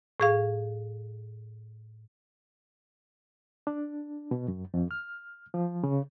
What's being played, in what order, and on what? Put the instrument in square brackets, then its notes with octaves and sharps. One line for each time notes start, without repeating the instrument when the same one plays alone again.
[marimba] A2 G#4 F5
[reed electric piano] D4
B2
F#2
F2
F6
F3
C#3